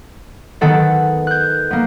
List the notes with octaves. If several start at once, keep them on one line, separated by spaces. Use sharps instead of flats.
D#3 B3 A4 F#5
F#6 G6
A#3 B3